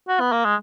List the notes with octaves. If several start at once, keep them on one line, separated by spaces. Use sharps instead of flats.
F#4
B3
A#3
G#3